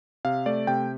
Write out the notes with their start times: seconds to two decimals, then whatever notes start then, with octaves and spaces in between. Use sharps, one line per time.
0.25 C3 F5
0.46 A3 D5
0.67 C3 G5